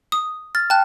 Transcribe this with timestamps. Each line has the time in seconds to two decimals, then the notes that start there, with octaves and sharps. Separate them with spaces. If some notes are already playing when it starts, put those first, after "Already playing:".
0.12 D#6
0.55 F6 A6
0.70 G5 A5 F#6